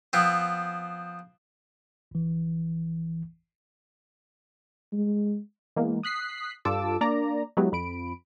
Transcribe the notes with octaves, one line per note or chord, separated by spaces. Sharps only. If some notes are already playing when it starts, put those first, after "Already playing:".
F3 B3 C4
G1 E3
G#3
E3 G#3 A#3 B3
D#6 F#6 B6 C7
G2 F4 A4 A5 D6 E6
A#3 D4 D5 A#5
F#3 G#3 B3 E4 G4
F2 B5 D7